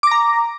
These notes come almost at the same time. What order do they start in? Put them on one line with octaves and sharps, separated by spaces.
D6 A#6 A#5